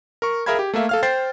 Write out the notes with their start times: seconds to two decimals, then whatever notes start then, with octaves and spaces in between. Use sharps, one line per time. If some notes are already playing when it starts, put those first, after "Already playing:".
0.22 A#4 C#6
0.46 G#4 A#4 E5 F5 B5 G#6
0.59 G4
0.73 A3 A#3 E5 F5
0.89 A4 F5 F6
1.03 C5 G5 A6 C7